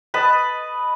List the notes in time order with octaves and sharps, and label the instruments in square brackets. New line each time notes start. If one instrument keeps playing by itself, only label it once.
[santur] B4 D#5 A5 B5